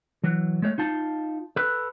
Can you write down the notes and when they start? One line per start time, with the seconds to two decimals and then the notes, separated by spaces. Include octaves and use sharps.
0.24 E3 F#3
0.62 G#3 A3 C#5
0.78 D#4 F4 A5
1.56 A4 B4